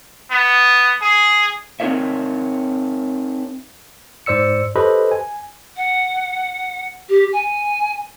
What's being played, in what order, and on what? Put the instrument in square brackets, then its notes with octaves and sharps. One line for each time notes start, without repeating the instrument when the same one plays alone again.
[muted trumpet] B3
G#4
[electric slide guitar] C4 D#4 A#4 C#5 E5
[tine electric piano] G#2 C5 D5 E6 C#7
G4 A4 B4 C5 D#5 B5
G#5
[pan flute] F#5
G4
G#5